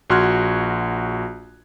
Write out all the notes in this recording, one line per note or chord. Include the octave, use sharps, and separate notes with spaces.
A#1 F#4 C6 F6 F#6 G#6